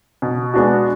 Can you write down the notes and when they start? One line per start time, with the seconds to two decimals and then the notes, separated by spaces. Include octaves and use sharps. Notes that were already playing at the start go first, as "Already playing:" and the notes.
0.22 B2
0.54 G#3 B3 D4 F#4